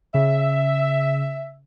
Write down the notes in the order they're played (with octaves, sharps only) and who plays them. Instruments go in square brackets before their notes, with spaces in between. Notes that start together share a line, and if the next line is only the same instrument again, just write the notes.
[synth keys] C#3 [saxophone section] E5